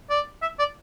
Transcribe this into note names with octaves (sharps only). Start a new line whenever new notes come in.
D5
E5
D5